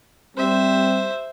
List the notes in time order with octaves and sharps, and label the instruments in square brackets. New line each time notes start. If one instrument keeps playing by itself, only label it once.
[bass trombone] G3 [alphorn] C4 [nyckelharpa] C5 E5